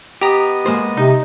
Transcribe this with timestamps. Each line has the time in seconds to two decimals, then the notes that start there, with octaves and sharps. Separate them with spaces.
0.21 B3 G4 D#5 A#5
0.66 G#3 A#3 C5
0.97 C3 D#4